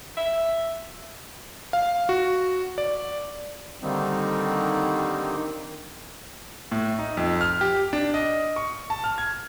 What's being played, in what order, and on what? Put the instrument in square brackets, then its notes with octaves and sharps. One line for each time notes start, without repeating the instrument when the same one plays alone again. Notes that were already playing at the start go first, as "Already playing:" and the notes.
[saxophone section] E5
[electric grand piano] F5
F#4
D5
[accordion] D3 D#3 G3 A#3 C4 D#4
[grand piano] A2
D#4
F2
F6
G4
D4
D#5
C#6
A5
F6
G#6